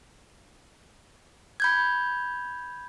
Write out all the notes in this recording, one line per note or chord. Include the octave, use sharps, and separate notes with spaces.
B5 G6 G#6